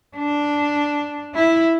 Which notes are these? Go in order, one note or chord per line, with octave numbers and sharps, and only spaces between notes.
D4
E4